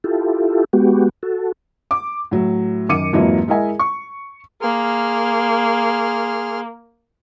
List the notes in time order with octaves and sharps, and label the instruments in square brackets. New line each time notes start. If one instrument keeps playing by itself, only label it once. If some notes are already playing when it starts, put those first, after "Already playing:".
[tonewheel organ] E4 F4 G4 A4
G#3 B3 F#4 G4
F#4 A4
[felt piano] D6
A2 F#3
F#2 D#3 D6 C#7 D#7
F2 G#2 E3 F#3 A#3
G#3 E4 A#4 D#5 E5 G#5
C#6
[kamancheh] A#3 [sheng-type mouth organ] G#4 C6 F6